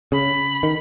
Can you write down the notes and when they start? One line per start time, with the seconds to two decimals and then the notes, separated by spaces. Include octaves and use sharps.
0.12 C#3 B5
0.63 D#3